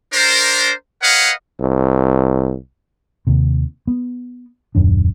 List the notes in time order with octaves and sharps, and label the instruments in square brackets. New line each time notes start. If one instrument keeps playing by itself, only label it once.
[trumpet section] D4 A#4 C5
A#4 B4 C#5 D#5 F5 F#5
[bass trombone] C2
[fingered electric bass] D#2 C3
B3
D#1 F#2 D#3 D4